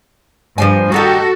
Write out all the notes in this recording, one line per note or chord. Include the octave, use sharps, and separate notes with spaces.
G2 F3 C5 G#5
D#3 D#4 F#4 G4 A4